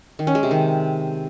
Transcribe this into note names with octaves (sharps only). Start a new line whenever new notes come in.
D#3
C#4
G#3
C3
D#3